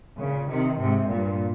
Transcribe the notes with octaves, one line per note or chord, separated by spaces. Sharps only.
A#2 C#3
C3 D#3
G#2 C3
G2 A#2